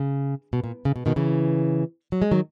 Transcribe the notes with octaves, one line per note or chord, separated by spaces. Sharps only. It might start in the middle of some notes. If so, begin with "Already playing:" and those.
Already playing: C#3
B2
A#2
C#3
B2
B2 D#3
C#3 E3
F#3
G#3
D#3 F#3